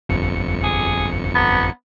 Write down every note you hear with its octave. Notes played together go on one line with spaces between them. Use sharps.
G1 F2 C#7
G#4
B3